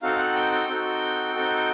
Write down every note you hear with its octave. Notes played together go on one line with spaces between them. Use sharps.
C4 D#4 F#4 A4 F5
F#5
G5
G5
C4 D#4 F#4 A4
C4 D#4 F#4 A4